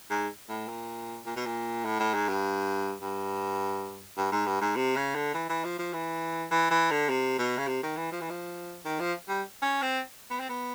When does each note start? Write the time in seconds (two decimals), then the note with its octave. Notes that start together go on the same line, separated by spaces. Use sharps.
0.10 G#2
0.49 A2
0.68 A#2
1.26 A#2
1.36 B2
1.46 A#2
1.85 A2
2.00 A2
2.14 G#2
2.28 G2
3.02 G2
4.17 G2
4.32 G#2
4.47 G2
4.61 G#2
4.76 C3
4.96 C#3
5.15 D3
5.34 E3
5.49 E3
5.64 F3
5.79 F3
5.93 E3
6.51 E3
6.71 E3
6.91 D3
7.10 C3
7.39 B2
7.58 C#3
7.67 C3
7.83 D#3
7.97 E3
8.12 F3
8.21 E3
8.30 F3
8.85 D#3
9.00 F3
9.28 G3
9.62 C#4
9.82 C4
10.30 B3
10.40 C4
10.49 B3